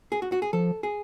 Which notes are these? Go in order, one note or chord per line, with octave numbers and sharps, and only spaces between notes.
G#4
F#4
F#4
G#4
F3 A4
G#4